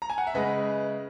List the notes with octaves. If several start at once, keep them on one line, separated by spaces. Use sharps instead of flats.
A#5
G#5
F#5
E5
C#3 G#3 B4 D#5